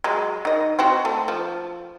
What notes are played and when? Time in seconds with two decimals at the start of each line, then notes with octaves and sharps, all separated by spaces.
0.04 F#3 G#3
0.45 D#3 D#5
0.79 C4 E4 F#4
1.05 A3
1.28 F3